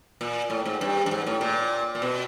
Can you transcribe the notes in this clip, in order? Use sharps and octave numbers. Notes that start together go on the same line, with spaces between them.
A#2
A2
G#2
G2
G2
G#2
A2
A#2
A#2
B2